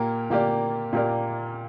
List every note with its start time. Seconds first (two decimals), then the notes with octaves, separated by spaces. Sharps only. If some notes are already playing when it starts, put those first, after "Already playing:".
Already playing: A#2 A#3 G4 A#4
0.30 A#2 A#3 G4 A#4 D5
0.93 A#2 A#3 G4 A#4 D5